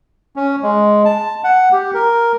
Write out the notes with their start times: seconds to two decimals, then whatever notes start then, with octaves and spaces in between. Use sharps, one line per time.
0.36 C#4
0.63 G#3
1.05 A5
1.44 F#5
1.72 G4
1.94 A#4